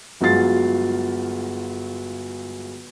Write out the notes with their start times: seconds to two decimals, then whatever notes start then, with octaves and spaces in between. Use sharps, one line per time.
0.21 G1 F#3 G#3 F4 A6 C7